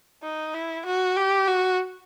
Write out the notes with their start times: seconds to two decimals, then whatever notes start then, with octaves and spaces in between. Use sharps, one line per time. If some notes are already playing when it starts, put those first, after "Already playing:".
0.23 D#4
0.54 E4
0.86 F#4
1.17 G4
1.47 F#4